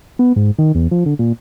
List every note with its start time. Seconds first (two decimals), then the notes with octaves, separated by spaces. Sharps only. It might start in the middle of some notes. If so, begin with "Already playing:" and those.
0.19 B3
0.36 G#2
0.59 D#3
0.75 E2
0.91 F3
1.06 D3
1.19 A#2